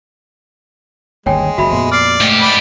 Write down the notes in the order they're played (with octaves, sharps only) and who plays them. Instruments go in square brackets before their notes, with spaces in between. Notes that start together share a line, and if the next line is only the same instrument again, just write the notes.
[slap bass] G1 D#2 [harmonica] G#3 [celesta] C#5 G5 G#5
[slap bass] F#1 [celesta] F#4 E5 B5
[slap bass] F2 A#2 B3
[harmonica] D5 [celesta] F6 C7
[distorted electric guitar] G#2 G4 [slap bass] A3
[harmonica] D5 B5